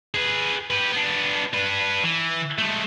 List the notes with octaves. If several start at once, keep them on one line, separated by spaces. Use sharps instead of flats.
G#4 B4
G4 B4
B3 D4
D4 B4
E3
G#3 A3